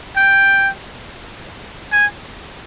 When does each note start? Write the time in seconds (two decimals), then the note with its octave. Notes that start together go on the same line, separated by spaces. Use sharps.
0.17 G5
1.93 G#5